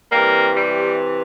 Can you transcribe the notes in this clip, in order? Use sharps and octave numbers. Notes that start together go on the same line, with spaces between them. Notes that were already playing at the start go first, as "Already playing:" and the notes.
C3 E3 G3 A#3
G3